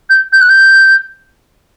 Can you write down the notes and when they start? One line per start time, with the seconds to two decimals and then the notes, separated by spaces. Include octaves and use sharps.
0.10 G6
0.33 G6
0.41 F#6
0.49 G6